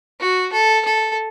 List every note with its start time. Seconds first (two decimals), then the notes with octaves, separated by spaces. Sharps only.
0.20 F#4
0.53 A4
0.85 A4